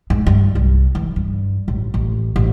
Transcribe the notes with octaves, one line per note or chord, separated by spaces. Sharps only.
G#2
G2
C2
E3
G2
A1
A1
A1